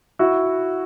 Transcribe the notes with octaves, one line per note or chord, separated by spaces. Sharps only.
E4 F#4